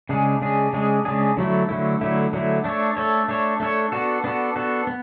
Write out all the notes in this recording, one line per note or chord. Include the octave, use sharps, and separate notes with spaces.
C#3 G#3 D4 G#4
C#3 G#3 D4 G#4
C#3 G#3 D4 G#4
C#3 G#3 D4 G#4
D3 F#3 A3 E4
D3 F#3 A3 E4
D3 F#3 A3 E4
D3 F#3 A3 E4
A3 D4 A4 C#5
A3 D4 A4 C#5
A3 D4 A4 C#5
A3 D4 A4 C#5
B3 D4 F#4 A4
B3 D4 F#4 A4
B3 D4 F#4 A4
B3